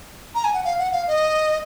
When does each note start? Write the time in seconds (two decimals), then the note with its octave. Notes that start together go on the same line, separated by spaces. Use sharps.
0.35 A#5
0.44 G#5
0.54 F#5
0.65 F5
0.78 F#5
0.92 F5
1.07 D#5